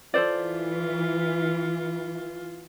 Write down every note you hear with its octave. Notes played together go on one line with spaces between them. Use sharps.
E3 F4 A4 C5 D5